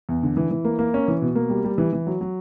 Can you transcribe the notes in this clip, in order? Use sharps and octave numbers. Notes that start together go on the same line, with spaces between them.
E2
D3
E3
E3
A#3
A#3
C#4
E3
B2
A#3
G3
G3
E3
E3
F#3
F#3